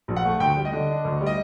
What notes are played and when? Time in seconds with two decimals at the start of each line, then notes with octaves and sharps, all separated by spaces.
0.08 A#1
0.16 F#5
0.25 A3
0.40 D2 G5
0.57 G3
0.65 D#5
0.73 D3
0.89 D4
1.05 D2
1.21 G3
1.26 D#5